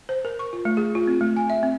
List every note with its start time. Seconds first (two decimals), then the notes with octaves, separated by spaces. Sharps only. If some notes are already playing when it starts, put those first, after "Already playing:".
0.09 C5
0.25 A#4
0.39 C#6
0.53 F4
0.65 A3
0.77 G#4
0.95 F4
1.07 C4
1.21 A3
1.36 G#5
1.50 E5
1.63 C4